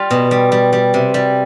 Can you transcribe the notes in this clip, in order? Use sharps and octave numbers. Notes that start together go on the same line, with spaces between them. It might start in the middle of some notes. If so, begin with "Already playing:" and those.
Already playing: G3 F4
B2
G3
G3
G3
C3
G3